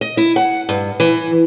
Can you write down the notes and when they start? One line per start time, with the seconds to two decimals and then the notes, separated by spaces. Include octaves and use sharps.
0.01 D#5
0.17 E4
0.36 F#5
0.69 G2
1.00 E3